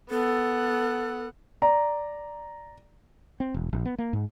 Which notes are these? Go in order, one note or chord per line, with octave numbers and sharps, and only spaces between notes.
B3 A4 F#5
D5 A#5
C4
E1
A#1
B3
A#3
G#2